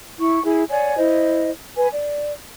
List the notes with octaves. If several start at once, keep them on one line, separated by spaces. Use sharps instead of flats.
E4 C#6
E4 G#4
C#5 D5 F#5 G#5
E4 C5 D#5
B4 G#5
D5